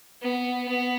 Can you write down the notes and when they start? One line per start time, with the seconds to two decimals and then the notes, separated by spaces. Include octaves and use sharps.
0.22 B3
0.68 B3